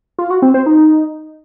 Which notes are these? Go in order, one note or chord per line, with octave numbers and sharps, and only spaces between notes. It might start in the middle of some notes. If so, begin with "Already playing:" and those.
F4
F#4
C4
C5
D#4